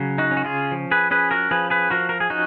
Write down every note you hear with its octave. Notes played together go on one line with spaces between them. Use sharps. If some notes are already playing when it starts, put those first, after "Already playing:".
Already playing: C#3 F#3
D#4 F#4
C#4
F#4
F4 G#4
F3
G#4 B4
C#4 G#4 B4
F#4 A#4
F3 G#4 B4
G#4 B4
F3 F#4 A#4
A#4
G#4
C#4 D#4 F#4